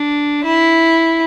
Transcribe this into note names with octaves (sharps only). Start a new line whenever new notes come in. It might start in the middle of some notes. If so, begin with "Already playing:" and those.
Already playing: D4
E4